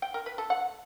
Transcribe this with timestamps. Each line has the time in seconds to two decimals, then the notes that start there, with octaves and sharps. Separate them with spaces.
0.02 G5
0.14 A#4
0.26 B4
0.38 A4
0.50 F#5